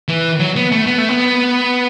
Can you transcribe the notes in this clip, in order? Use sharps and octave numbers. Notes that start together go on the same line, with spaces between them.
E3
F#3
B3
A3
B3
A3
B3